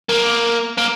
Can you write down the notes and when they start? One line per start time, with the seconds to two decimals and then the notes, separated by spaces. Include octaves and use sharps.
0.09 A#3
0.78 A#3